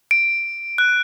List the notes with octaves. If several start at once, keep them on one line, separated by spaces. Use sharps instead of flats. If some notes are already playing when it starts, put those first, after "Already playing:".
D7
F#6